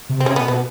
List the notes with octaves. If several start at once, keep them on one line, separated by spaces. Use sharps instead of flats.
C3
C4
C3 C#4
B2 B3
B2 B3